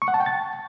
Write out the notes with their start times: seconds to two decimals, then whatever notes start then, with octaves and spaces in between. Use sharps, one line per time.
0.02 C#6
0.08 F#5
0.14 A5
0.20 G5
0.26 A6